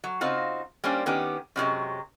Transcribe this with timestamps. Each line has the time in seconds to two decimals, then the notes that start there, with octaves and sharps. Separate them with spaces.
0.04 F#3
0.21 C#3 C4 D#4 F4 F#4
0.84 G3 A#3 C#4 D4 C5
1.06 D#3 B3 C#4 G4
1.56 F#2 C3 F#3 G#3